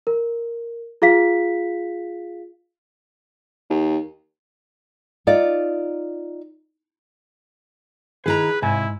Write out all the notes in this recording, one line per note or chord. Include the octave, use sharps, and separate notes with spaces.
A#4
F4 G#4 F5 B6
D#2
D#4 F4 D5
D#3 E4 G#4 B4 A#5
G#2 C3 E4 G#5